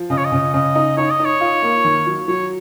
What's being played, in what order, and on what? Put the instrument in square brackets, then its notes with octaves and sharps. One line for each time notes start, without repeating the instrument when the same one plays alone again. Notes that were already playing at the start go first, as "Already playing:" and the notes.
Already playing: [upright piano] F3
[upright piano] C#3 [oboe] D#5
[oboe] C#5
D#5
[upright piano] C#3
[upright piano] C#3 [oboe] D#5
[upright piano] D#4
[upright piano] D#4 [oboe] C#5
[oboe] D#5
[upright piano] D#4
[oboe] C#5
[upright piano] F4
A#3
D#3
F#3
[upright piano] F#3 [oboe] C#5